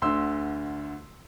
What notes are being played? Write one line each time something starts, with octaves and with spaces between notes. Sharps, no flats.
D2 D3 C6 E6